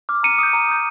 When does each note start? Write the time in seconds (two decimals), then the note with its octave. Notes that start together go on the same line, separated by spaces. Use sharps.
0.09 D6 F6
0.23 A#5 C#7 D#7
0.38 D#6 G6
0.53 A#5
0.68 D#6 G6